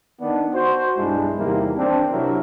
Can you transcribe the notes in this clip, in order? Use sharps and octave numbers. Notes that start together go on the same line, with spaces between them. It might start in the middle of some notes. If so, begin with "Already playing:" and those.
D#3 B3 D4
F#4 C5
B1 G2 G#3 D4 E4
E2 C3 D#3 G3 A#3 E4
C4 D4
C3 F#3 D4 E4 A#4